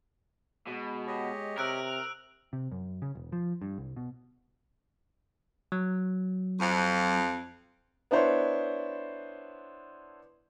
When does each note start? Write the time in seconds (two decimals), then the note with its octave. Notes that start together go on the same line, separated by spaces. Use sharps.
0.67 B2 G#3
1.07 G4 C#5 D#5
1.58 C3 A#4 E6 F#6 D7
2.53 C3
2.72 F#2
3.02 C#3
3.15 E1
3.32 F3
3.62 G2
3.78 C2
3.96 B2
5.72 F#3
6.59 F2
8.11 B3 D4 E4 C5 C#5